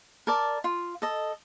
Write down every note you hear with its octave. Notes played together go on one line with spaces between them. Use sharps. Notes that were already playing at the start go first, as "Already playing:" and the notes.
A#4 D5 A5
F4
A4 D#5